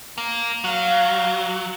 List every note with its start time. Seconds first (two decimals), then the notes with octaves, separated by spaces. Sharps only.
0.18 A#3
0.64 F#3 F5